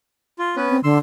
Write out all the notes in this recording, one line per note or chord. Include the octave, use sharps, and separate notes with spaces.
F4
B3 C#4 B4
C4
D3 C6 E6